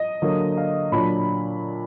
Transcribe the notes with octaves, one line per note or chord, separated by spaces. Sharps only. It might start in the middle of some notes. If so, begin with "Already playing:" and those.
Already playing: D#5
D3 F#3 A#3
F5
A#2 F#3 D4 B5